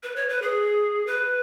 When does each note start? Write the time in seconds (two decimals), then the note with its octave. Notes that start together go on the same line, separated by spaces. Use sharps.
0.03 B4
0.16 C#5
0.29 B4
0.42 G#4
1.07 B4